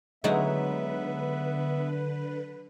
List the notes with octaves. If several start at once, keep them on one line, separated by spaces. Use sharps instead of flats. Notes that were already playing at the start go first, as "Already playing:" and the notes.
D3 F#3 G#3 B3 D#4 E4 B4 E5